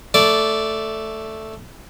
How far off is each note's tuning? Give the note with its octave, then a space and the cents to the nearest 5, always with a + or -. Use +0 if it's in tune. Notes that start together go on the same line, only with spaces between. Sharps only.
A3 +0 D5 -10